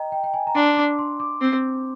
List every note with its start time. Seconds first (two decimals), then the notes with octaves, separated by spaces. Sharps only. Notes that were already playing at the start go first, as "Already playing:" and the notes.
Already playing: D#5 G5 A#5
0.12 G5
0.24 G5
0.34 G#5
0.47 A#5
0.55 D4 C6
0.77 D6
0.99 C6
1.20 D6
1.41 C4